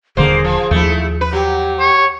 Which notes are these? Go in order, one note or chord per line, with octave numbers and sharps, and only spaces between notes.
D#1 D3 A#3 G#4 C5
F3
D#2 F3 A3 E4
B4
F#3 G4
C#5